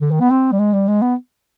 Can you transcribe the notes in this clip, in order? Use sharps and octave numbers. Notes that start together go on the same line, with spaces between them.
D3
D#3
B3
C4
G3
G#3
G3
G#3
B3